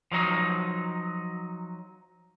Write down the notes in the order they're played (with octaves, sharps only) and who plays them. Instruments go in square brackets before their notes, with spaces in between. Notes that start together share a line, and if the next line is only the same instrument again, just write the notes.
[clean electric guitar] F3 F#3 D#4